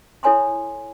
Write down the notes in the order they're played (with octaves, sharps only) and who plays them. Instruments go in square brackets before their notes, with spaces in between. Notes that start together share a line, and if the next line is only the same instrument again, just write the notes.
[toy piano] E4 A4 C#5 G#5 A#5 C6